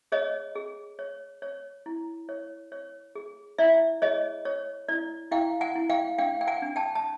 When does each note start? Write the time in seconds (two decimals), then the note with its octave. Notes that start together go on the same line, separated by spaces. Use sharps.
0.12 G#4 C#5 D#5
0.55 G#4
0.99 C#5
1.42 C#5
1.86 E4
2.29 C#5
2.72 C#5
3.15 G#4
3.58 E4 D5 E5
4.02 G#4 C#5 D#5
4.45 C#5
4.88 E4 D5
5.31 E4 F5 G5
5.61 F#5 G#5
5.75 E4
5.90 F5 G5
6.18 D4 F5 G5
6.41 G5
6.47 F#5 G#5
6.62 D4
6.76 G5 A5
6.95 A5